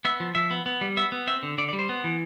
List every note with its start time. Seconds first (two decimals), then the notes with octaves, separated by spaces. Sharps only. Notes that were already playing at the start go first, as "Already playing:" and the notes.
0.05 B3 E5
0.20 F3
0.35 F3 E5
0.51 B3
0.66 B3
0.81 G3
0.97 B3 E5
1.12 B3
1.27 C4 E5
1.43 D3
1.58 D3 D5
1.69 D5
1.73 G3
1.79 C5
1.89 B3
2.04 E3